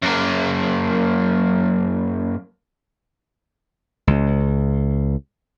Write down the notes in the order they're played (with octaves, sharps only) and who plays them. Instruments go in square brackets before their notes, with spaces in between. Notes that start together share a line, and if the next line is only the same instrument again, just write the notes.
[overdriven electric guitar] F#2 A#3
[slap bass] C#2